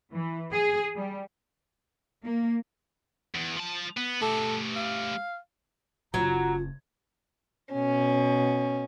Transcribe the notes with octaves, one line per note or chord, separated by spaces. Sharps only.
E3
G#4
G3
A#3
E2
F3 A5
B3
A3 G4 A4
F5
F#1 F#3 C#4 F4 A#5
B2 C#4